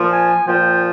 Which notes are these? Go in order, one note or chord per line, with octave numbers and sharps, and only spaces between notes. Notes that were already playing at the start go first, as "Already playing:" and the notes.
Already playing: A#2 F3
G#5
A#2 F3 G5